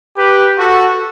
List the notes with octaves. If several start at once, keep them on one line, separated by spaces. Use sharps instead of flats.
G4 B4
F#4 A4